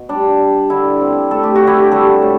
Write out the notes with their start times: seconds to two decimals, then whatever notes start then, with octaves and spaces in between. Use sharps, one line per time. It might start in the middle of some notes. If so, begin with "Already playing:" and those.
Already playing: B2
0.09 G3 D4
0.40 G3
0.70 D3 E4
1.01 C4
1.31 A3 A4
1.43 G4
1.56 F#4
1.61 D3
1.67 E4 G4
1.91 G3 F#4 A4
2.22 A2